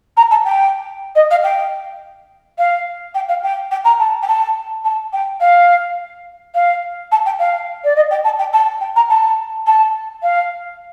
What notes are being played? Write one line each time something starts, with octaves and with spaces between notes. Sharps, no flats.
A#5
A5
G5
D#5
F5
G5
F5
G5
F5
G5
G5
A#5
A5
G5
A5
A5
G5
F5
F5
A5
G5
F5
D5
D#5
G5
A5
G5
A5
G5
A#5
A5
A5
F5